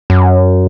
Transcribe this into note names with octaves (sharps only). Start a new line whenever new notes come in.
F#2